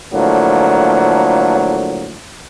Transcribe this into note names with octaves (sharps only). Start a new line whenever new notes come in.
A2 D3 F3 F#3 A#3